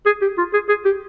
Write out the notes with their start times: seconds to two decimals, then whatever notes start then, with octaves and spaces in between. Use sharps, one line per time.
0.06 G#4
0.21 G4
0.38 F4
0.53 G#4
0.69 G#4
0.85 G4